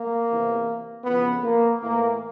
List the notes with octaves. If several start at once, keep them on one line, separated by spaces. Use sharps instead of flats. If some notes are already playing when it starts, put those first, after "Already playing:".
Already playing: A#3
E2 C3 E3
F2 C#3 E3 B3
A#3
A2 E3 A#3